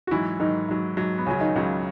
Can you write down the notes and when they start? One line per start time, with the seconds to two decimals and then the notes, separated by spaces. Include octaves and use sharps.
0.07 F#4
0.11 G#2 E3 F#3 E4
0.40 G#2 D#3 F#3 D#4
0.68 G#2 F#3
0.97 G#2 F#3
1.18 B3
1.26 C#2 C#3 F#3 C#4
1.40 D#3 D#4
1.56 C#2 C#3 F#3